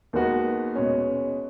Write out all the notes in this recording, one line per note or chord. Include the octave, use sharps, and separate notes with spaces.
D#2 D#3 G#3 B3 F#4
B2 G#3 C#4